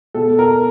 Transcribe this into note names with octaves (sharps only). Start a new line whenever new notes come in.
B2 A4
A#4